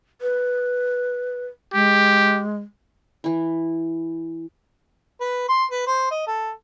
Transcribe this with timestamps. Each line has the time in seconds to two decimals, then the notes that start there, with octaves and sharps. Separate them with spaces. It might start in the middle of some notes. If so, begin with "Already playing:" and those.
0.21 B4
1.74 G#3 G4
3.24 E3 E4
5.20 B4
5.49 C6
5.71 B4
5.86 C5
6.10 D#5
6.27 A4